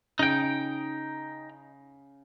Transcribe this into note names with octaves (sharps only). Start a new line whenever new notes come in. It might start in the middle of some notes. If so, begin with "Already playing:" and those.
C#3 D#4 G5 D7